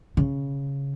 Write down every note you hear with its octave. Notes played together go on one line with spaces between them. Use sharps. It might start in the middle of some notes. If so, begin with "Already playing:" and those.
C#3